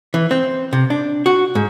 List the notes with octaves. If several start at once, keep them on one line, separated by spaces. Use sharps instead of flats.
E3
C4
C3
D4
F#4
G#2